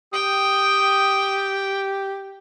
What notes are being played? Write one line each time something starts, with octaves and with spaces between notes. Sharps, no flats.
G4 G5 D#6